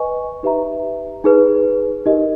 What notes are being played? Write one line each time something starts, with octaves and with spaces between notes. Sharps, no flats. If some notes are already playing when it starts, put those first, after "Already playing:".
Already playing: B4 D#5 G#5 C#6
D#4 G4 B4 E5 A#5
D#4 G#4 B4
D#4 G4 A#4 D#5